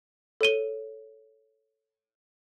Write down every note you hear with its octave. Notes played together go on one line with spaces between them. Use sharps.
A4 C#5 D#7 G7